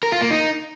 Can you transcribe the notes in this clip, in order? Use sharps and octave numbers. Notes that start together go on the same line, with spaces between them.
A#4
F4
A#3
D#4